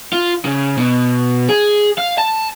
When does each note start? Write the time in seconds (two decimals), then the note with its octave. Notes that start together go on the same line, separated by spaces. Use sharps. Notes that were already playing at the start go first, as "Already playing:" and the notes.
0.13 F4
0.45 C#3
0.78 B2
1.49 G#4
1.98 F5
2.18 A5